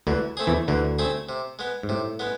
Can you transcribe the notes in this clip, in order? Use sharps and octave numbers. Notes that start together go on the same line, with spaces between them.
D2 D3 E3
A3 C4 G#4
E2 E3
D2 D3 E3
A3 C4 G#4
C3
G#3 B3
G#2
A2 C3
G#3 B3